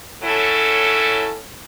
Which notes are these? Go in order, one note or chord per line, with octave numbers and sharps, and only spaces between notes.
F#3 C#4 E4 A4